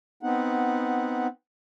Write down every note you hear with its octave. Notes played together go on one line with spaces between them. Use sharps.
B3 C4 D#4 F#5